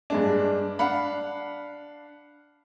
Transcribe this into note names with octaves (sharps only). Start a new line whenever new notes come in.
G2 G#3 D4
D4 F5 F#5 B5